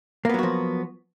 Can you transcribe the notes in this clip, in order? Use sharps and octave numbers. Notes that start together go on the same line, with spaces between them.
F3 F#3 A#3 B3 F#4